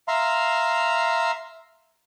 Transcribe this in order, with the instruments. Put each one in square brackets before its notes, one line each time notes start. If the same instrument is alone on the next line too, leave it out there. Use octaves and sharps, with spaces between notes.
[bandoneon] E5 F5 A#5 C6